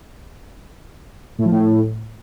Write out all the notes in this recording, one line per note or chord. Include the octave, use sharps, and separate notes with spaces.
A2
F3
A2